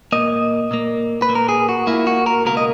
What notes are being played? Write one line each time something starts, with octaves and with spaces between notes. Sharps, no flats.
A#2 A#3 D#5
A#2 A#3
B4
A#2 A#3
A#4
G#4
F#4
A#2 A#3 E4
F#4
A#4
C#2 B2 A#3 A#4
D#5